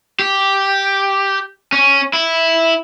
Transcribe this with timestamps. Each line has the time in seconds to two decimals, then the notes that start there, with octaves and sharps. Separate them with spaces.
0.19 G4
1.72 C#4
2.13 E4